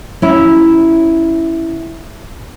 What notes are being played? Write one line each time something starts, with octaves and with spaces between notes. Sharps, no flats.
C#4 E4